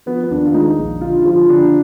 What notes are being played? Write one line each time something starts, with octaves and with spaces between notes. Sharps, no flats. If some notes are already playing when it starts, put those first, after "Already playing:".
F3 B3
B3
D#2 D4
F4
G#3 D#4
A#1
D3 F4
F3 F4
D3 D4